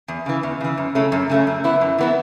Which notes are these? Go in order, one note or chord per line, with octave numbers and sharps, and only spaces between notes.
E2
C#3 E3
E2
C#3 E3
F#2
C#3 A3 C#4
F#2
C#3 A3 C#4
F#2
E3 B3 E4
F#2
E3 B3 E4